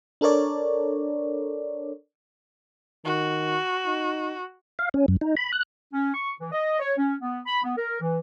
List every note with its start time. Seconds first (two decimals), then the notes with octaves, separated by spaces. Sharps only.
0.21 D4 A4 A#4 C#5 D5
3.05 D#3 F#4
3.85 D#4
4.79 F5
4.94 C#4
5.08 F#2
5.21 D#4
5.37 B5
5.53 F#6
5.93 C#4
6.14 C#6
6.40 E3
6.52 D#5
6.80 C#5
6.97 C#4
7.20 B3
7.46 B5
7.63 B3
7.77 A#4
8.01 E3